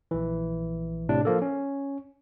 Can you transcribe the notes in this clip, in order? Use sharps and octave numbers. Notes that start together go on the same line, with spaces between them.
A#1 E3
A2 C3 D4
F3 A#3 A4
C#4